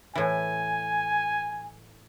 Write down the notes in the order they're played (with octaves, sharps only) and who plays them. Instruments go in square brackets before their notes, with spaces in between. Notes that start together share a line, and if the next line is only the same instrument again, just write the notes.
[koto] A2 E3 [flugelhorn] G#5